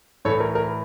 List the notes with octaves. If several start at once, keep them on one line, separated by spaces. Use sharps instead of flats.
A2 E3 A4 C#5
A#4
A#4